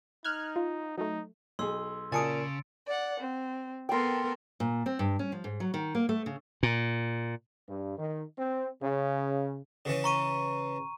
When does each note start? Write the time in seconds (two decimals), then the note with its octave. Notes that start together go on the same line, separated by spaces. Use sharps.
0.24 D#4 F6 F#6 G#6
0.56 F4
0.97 F#3 A3 D#4
1.59 B1 G#4 C6 E6
2.12 A#2 C#3 G#5 A5 D#6 A6 C#7 D7
2.87 D5 F#5
3.19 C4
3.89 B3 A4 A#4 G5 C6
4.60 A#2
4.86 C4
4.99 G2
5.19 C#4
5.32 F3
5.44 G#2
5.60 F#3
5.74 D#3
5.95 A#3
6.09 A3
6.26 C#3
6.63 A#2
7.68 G2
7.98 D#3
8.38 C4
8.82 C#3
9.85 C#3 E3 C#4
10.04 A#5 C#6 D#7